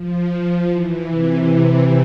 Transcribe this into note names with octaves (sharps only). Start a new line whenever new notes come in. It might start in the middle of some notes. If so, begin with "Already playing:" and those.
Already playing: F3
E3
C3